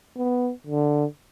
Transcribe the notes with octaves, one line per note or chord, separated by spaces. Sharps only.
B3
D3